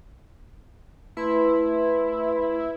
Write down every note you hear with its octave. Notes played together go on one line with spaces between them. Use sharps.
A3 E4 B4 C6